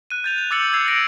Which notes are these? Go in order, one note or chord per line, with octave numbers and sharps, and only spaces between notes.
F#6 D#7
G6 A6 F7
F7
D6 E6 A6 C#7 F#7
E6 G#6 A6 C7 F7
A#6 D7